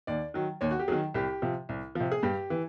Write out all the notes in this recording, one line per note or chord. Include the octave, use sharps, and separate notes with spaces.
D#2 D5
D#3 F#3
D#2 C#5
F#4
G4
D#3 F#3 G#4
C2 G4
C3 F3
C2
C3 F3
G#4
G2 G4
E3